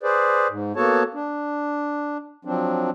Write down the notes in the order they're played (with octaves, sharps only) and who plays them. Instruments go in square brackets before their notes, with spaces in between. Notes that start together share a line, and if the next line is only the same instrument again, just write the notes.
[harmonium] G#4 B4 C5 D5
G#2
A#3 B3 F#4 A4 C#5 A5
D4
F3 F#3 C4 D4